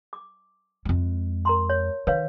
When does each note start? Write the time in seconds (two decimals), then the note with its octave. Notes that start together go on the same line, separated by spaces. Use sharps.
0.13 D6
0.85 F2 G#3
1.45 A#4 A#5 C6
1.70 C#5
2.07 D#3 B4 C#5 F5